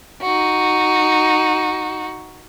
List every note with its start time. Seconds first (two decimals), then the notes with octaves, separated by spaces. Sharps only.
0.22 D#4 F#4